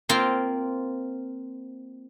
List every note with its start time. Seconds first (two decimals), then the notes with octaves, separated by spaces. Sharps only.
0.09 A#3 C4 F4 G5 C6